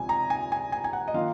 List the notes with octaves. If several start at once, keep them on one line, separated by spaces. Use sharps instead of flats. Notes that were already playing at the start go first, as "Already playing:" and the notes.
Already playing: C#2 C3 F3 G#5
A#5
G#5
G#5
G#5
G#5
F#5
D#5
D#3 A#3 F4 F5